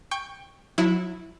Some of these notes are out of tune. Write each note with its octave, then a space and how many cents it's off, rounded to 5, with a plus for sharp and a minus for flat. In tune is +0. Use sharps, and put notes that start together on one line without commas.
G5 +15 C#6 +0
F#3 -30 E4 +0